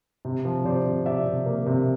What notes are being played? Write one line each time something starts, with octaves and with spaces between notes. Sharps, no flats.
C3
F3
C3 C5 D5
C3
C3 D5 E5
C3
A#3
C3